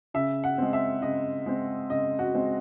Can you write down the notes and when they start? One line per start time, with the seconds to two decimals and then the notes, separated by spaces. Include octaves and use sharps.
0.14 C#3 E5
0.44 F#5
0.58 G#3 C4
0.73 E5
1.02 C#3 D#5
1.46 G#3 C4
1.90 C#3 D#5
2.19 F#4
2.34 G#3 C4